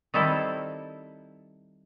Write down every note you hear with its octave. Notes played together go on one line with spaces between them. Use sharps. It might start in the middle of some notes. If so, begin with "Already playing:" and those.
D#3 G3 C4 E4 A4